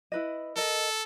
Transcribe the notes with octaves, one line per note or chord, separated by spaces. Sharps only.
E4 B4 D#5
A4 A#4 D#5